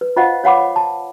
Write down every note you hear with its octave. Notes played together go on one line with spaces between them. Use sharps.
B4
F4 C5 D#5 F5 F#5
C#5 F5 F#5 B5 D6
A5